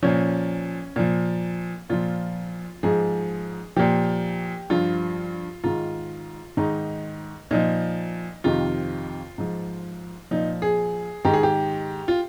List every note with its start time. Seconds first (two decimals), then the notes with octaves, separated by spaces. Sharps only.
0.03 A#2 F3 C#4
0.96 A#2 F3
1.90 A#2 F3 F4
2.83 G#2 F3 G#4
3.76 A#2 F3 G4
4.70 G2 F3 F4
5.64 G#2 D#3 F4
6.57 G#2 D#3 D#4
7.51 A#2 F3 D#4
8.44 F2 C3 D#3 F4
9.38 G#2 F3
10.31 A#2 F3 D#4
10.62 G#4
11.25 G#2 D#3 G4
11.34 G#4
11.43 G4
12.08 F4